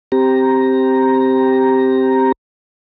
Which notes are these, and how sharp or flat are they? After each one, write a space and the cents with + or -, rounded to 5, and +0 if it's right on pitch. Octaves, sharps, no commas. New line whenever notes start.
C4 +0 G4 +0 A#5 +0